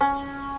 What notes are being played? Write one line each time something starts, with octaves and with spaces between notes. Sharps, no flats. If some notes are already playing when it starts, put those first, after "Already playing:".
C#4